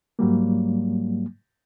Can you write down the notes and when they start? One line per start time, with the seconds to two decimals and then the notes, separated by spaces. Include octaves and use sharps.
0.19 G#2 F#3 G3 A#3